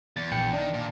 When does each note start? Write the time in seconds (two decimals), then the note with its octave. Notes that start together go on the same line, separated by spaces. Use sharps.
0.17 E2 A6
0.32 A#1 G5 C#7
0.53 D#3 D4
0.74 A#2